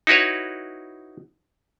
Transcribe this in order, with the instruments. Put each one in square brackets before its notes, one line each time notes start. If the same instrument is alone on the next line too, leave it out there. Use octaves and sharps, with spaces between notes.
[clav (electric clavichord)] D#4 E4 F#4 B4 C#5